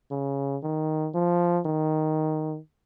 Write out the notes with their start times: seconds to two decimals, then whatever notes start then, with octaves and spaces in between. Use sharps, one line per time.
0.11 C#3
0.63 D#3
1.14 F3
1.66 D#3